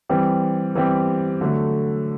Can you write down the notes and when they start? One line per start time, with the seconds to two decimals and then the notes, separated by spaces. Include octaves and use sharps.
0.09 E3 G3 C4 G4
0.75 E3 G3 C4 G4
1.41 D3 F#3 A3